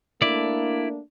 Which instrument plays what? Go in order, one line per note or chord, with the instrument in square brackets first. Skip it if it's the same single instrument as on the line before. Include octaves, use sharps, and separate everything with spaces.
[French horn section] A3 A#3 D4 [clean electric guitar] E4 D5